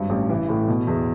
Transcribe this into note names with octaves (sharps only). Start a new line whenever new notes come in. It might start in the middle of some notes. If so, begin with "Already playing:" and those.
Already playing: G#1 G2
A1
E3
A2
B2
E2